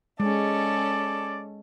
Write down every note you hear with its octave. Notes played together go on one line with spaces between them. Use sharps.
G#3 C#4 A4 D5